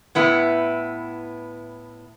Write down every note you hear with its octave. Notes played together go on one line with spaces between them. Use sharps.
A2 B3 E4